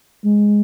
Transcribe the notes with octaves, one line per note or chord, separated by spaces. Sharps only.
G#3